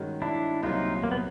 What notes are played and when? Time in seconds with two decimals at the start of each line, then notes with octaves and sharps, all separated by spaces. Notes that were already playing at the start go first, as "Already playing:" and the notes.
Already playing: G2 D#3 G#3 C#4 F#4
0.22 D4 E4
0.63 C2 A#2 F#3 D#4 F4
1.04 A#3
1.11 B3